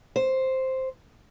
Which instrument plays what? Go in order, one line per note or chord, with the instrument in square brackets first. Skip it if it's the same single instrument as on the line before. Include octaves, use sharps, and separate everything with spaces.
[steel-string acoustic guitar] C5